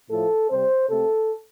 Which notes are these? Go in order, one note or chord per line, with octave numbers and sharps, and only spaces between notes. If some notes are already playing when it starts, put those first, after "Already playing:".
A2 F3 A3 A4
C3 G3 C4 C5
C3 A3 C4 A4